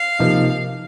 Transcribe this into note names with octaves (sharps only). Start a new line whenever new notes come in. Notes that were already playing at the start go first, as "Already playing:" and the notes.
Already playing: F5
C3 F3 A#3 D#4